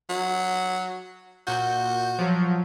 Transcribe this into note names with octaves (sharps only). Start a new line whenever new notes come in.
F#3
A#2 F#4 G6
F3 F#3